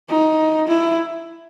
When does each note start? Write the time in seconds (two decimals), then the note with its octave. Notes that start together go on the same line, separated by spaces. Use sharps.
0.09 D#4
0.68 E4